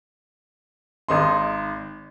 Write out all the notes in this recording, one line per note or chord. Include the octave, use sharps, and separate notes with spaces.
G#1 D#4 C6